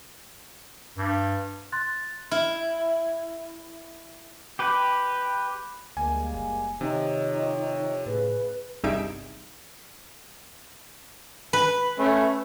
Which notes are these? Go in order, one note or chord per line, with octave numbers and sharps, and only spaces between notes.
G2
C6 F#6 A6
E4 F6
G4 B4
D2 G3 G#3 A#3 G#5
F#1
F2 C3 D#3 D#4 C#5
A2 C#3 G#4 B4
G1 C2 D#4 G#4 E5 D7
B4
A3 C#4